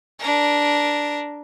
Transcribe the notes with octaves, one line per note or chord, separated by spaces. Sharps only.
D4 A#4